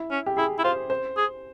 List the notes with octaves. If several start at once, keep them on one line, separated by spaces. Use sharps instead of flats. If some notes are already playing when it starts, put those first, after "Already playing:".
Already playing: E4
C#4
G4
E4 G#4
E4
F4 C5
C5
G#4